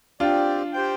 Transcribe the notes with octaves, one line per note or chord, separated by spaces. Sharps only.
C4 D4 F4 G4 D5
G4 C5 G5